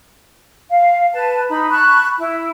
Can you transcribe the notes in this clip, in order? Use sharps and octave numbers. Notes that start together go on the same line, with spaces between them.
F5
B4 A5
D#4 B5
A5 B5 C#6 F#6
E4